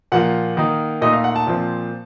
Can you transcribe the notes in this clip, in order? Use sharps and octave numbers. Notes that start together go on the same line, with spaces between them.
A#2 F3 A#3 F#5
D#3 A#3 D#4
A#2 A3 D#4 D#5
F5
F#5
A5
A#2 F3 C4